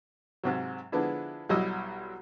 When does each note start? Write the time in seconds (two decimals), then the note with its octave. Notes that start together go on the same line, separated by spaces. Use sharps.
0.44 G#2 C3 F#3
0.92 D3 F3 G#3 B3 D4 E4
1.49 B1 F#3 G3 E4 D#5 E6